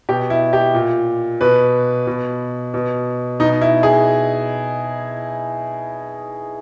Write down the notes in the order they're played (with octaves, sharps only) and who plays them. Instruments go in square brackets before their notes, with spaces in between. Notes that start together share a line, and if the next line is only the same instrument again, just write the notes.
[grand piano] B2 G4
E4
G4
A#2
B2 B4
B2
B2
B2 D#4
E4
G#4